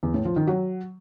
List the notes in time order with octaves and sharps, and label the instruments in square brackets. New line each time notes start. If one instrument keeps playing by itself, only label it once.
[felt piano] E2
A2
F3
D#3
F#3